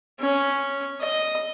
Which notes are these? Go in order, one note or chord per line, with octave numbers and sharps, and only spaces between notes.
C#4
D#5